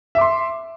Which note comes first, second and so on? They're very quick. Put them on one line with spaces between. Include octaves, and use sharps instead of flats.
E5 D6 C6